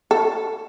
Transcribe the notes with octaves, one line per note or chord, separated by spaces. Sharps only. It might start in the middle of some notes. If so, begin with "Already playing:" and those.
A4